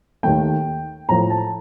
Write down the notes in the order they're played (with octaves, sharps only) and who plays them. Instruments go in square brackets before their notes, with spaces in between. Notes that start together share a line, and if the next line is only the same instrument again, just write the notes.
[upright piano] D#2 D#3 A3 G5
A2 F3 A3 A#5
A5